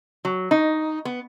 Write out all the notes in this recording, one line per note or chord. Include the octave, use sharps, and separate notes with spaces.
F#3
D#4
B3